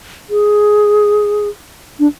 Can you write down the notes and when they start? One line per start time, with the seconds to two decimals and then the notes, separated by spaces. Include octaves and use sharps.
0.30 G#4
1.99 D4